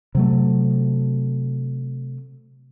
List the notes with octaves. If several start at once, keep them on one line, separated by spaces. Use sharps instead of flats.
C3 F#3 A3